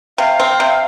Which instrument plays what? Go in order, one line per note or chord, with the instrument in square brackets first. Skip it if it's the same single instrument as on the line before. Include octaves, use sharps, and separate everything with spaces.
[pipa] C3 [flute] F5
[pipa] C4
C3